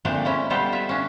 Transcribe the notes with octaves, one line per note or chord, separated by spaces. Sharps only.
A#2 F3 A3 A#3 C4 D4
G#3 C#4 E4
G3 B3 F4 A4 C5
E4 F4 E5
C#4 D4